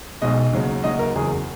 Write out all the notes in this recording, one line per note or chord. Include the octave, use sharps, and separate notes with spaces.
B1 B2 G#3 D#5
D#2 C#3 F#3
D#2 C#3 F#3 D#5
A#4
F#1 E2 C#3 F#3 G#4